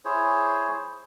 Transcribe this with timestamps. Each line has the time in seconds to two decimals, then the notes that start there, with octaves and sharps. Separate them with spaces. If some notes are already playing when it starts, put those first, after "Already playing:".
0.05 E4 G#4 C5 C#5